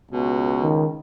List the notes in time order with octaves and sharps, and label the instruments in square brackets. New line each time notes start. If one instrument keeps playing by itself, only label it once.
[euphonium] C#2 [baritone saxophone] B2
[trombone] D#3